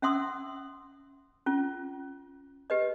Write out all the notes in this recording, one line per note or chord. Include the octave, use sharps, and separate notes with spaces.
C#4 E5 F#5 C6 D#6 E6
C#4 F4
G4 B4 D#5